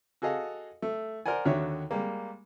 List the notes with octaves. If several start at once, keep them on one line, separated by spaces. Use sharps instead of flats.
F#4 G#4 A4 D#5 F5
A3
A#4 C5 D5 F#5 G#5
D#2 D3 D#3 F#4 C#5 E5
G3 G#3 A#3